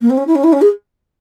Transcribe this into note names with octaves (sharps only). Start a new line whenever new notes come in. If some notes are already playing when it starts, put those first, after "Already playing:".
A#3
C4
C#4
E4
C#4
E4
C#4
G#4